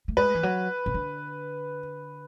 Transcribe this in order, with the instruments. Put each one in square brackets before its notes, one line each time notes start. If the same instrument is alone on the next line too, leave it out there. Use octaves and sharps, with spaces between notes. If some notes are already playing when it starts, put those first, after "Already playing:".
[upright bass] A3
[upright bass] G#3 [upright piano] B4
[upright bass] E3
F#3
C#3
D3